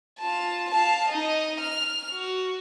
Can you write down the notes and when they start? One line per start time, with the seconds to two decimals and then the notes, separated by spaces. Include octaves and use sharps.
0.19 F4 A5
0.71 F5 A5
1.08 D#4 D#5
1.60 F6
2.12 F#4